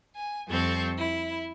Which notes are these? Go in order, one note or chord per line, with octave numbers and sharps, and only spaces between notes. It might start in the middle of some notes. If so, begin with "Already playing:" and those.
G#5
F2 G3 C4 A4 C#6
E4